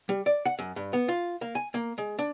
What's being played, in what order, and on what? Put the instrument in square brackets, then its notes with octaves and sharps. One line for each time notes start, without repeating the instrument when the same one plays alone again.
[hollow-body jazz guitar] G3
D5
F#5
F#2
G2
B3
F4
A#3
G#5
A#3
G#3
D4